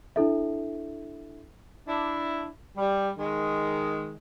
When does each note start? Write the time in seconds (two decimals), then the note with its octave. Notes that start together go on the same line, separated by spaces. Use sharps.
0.16 D4 E4 A4 E5
1.88 D4 E4
2.77 G3
3.18 D#3 G#3